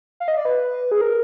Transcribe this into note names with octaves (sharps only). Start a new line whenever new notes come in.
F5
D#5
D5
B4
G#4
A#4